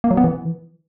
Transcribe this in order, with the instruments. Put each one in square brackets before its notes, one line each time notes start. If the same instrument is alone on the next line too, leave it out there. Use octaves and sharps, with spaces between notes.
[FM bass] A#3
F#3
B3
E3